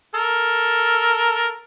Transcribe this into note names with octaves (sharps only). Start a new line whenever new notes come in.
A4 A#4